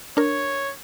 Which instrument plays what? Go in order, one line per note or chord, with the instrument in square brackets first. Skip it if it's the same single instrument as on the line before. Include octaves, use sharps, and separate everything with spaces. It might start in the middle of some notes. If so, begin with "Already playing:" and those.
[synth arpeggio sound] D4 A#4 [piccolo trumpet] C#5